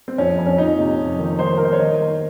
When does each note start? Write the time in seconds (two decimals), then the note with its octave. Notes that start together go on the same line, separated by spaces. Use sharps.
0.08 C4
0.18 F2 C#4
0.38 F2
0.46 C#4
0.58 F2 D#4
0.79 C3
0.99 F2
1.19 D#3
1.39 D#3 C5
1.58 D#3 A#4
1.64 C5
1.72 C#5
1.79 D#3 D#5
1.99 D#3